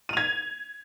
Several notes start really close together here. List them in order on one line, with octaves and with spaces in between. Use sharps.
D#7 F7 G#6